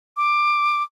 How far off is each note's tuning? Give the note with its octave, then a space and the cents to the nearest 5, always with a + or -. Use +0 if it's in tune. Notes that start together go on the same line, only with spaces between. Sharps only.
D6 +15